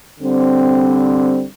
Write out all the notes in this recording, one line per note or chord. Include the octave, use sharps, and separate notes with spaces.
D3 G3 C4